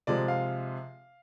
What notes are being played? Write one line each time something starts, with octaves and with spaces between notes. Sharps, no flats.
C3 F3 G#3 D5
F5